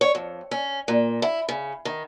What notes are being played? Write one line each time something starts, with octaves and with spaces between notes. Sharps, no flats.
C#5
F2
C#4
A#2
E4
C#3
D#3